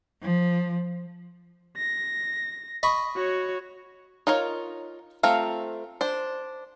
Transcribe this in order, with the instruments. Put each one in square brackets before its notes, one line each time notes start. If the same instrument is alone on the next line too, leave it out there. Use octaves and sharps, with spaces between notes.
[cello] F3
[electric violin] A#6
[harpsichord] D#5 B5 C#6
[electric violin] F#4 C#5
[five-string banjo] D#4 F4 A#4 C#5
A3 C4 F4 F5 A#5
D4 C5